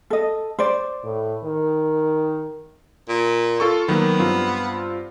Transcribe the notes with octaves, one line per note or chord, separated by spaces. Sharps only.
A4 D#5
C5 D5
A2
D#3
A#2
F4 A4 C#6
D#3 F#3 A#3 B3
G2 C4 F4